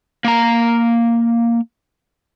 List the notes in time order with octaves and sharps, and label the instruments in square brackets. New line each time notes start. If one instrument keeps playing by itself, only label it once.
[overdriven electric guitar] A#3 A#5